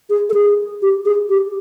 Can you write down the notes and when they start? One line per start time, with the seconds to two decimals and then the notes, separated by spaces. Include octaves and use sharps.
0.10 G#4
0.30 A4
0.34 G#4
0.82 G4
1.05 G#4
1.29 G4